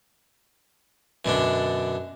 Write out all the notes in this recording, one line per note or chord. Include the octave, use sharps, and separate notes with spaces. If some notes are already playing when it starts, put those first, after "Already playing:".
F#2 B2 D3 D4